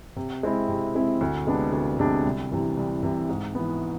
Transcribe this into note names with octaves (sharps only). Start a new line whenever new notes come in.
C3
G#3 C4 E4
C3
G#3 C4 E4
D2
C3 G#3 B3 D4
D2
C3 G#3 B3 D4
C2
C3 E3
C2
C3 E3
G#2
E3 B3